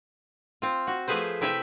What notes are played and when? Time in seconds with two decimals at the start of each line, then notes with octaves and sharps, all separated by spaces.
0.62 C4 F4
0.87 F#4
1.08 F3 A3 G#4 B4 C5
1.41 C3 E4 G4 B4 E5